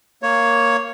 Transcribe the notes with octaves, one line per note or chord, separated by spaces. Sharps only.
A#3 C#5